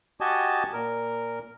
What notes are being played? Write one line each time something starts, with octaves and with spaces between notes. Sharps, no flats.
F#4 G4 D#5 G#5 A5
A#2 A#4